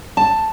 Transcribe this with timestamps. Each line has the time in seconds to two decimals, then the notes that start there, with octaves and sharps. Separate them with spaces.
0.17 A5